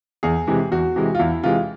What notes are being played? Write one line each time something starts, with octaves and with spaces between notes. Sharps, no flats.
E2 G#4
C3 E3 G#3
E2 F#4
C3 E3 G#3
F4
E2 E4
C3 E3 G#3 F4